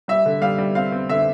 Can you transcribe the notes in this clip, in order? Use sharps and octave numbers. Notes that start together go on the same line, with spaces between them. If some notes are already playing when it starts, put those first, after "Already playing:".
G3 E5
D3
G3 F5
G3
C4 F5
C4
D3 E5